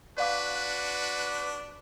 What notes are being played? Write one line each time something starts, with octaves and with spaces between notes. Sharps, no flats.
D4 F#4 B4 D5 F5 D6